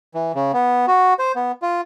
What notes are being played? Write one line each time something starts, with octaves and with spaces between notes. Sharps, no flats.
E3
C#3
B3
F#4
C5
B3
F4